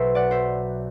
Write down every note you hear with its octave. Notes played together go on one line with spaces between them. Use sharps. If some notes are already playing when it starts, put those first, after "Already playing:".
Already playing: B1 B2 F#3 C5 E5
D5 F#5
C5 E5